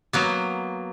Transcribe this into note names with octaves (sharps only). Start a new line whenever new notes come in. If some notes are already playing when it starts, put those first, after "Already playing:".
F#3 A#3 B3